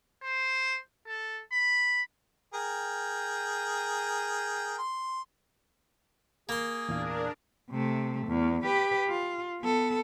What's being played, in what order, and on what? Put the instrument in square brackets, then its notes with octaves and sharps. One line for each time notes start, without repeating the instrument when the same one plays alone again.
[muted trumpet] C5
A4
B5
[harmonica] G#4 A#4 G5
C6
[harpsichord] A#3 C6 [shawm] G#4
[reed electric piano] E2 A#2 F5 [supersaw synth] D4 A#4
[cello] C3 A3
E2
G4 B4
F4
B3 A4